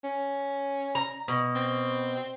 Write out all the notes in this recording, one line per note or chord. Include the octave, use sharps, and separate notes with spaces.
C#4
A#5
B2
C4